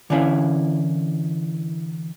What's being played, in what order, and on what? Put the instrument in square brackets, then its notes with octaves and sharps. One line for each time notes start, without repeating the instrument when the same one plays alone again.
[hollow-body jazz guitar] D3 E3 C#4 E4 F5